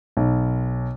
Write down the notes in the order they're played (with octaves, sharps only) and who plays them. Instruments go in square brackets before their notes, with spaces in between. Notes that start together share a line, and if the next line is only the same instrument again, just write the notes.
[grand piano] B1